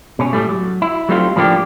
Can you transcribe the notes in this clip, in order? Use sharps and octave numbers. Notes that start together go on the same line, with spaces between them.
B2 C#4
A2 G3 A3
F#3
E4
F#3 G3 A3 C4 D#4 F4
A2 F3 G3 A#3 D4 G4